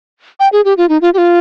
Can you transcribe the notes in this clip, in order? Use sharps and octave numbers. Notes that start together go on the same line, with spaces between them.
G5
G#4
G4
F4
D#4
F4
G4
F4